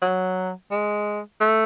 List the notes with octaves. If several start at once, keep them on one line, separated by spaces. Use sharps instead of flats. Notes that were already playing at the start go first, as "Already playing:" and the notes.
F#3
G#3
A3